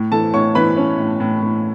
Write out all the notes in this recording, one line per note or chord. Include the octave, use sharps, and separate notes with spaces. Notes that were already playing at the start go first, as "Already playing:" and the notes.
Already playing: A2
E3 A4 A5
A2 C#5 C#6
E3 B4 B5
C#4
A2
A2
A2